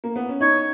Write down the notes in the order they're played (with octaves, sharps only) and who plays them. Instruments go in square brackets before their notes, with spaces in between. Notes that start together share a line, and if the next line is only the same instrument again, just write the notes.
[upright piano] A#3
B3
C#4
[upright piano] D#4 [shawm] C#5